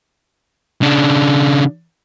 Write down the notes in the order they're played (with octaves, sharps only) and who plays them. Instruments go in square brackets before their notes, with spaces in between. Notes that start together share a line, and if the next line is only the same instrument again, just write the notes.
[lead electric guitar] C#3 D4